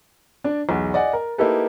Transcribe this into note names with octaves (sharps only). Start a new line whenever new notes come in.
D4 D5
B1 E2
D5 D#5 F#5 G#5
A#4
A#3 D#4 E4 G4 A4 B4